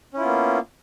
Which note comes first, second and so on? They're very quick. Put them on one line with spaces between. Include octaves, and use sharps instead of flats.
C#4 E4 F4 B3 A#3